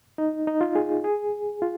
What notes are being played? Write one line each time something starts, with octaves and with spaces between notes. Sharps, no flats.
D#4
D#4
F4
G#4
G#4
F4